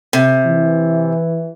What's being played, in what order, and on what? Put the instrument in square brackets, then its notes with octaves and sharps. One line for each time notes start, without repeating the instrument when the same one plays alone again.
[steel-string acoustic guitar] C3
[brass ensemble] E3